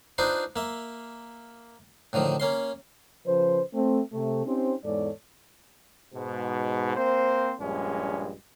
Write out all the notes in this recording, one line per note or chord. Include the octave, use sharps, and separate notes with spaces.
D4 D#4 F4 B4 C5
A#3 E5
A2 D3 D#3 F3
A#3 C#4 C6
C#3 F3 B4 C5
A3 C4
C3 A3
C4 C#4 D#4 G4 C5
E2 G#2 G#3 A4 C#5 D5
G#2 B2
A#3 C4 C5
A#1 G2 G#3 C#4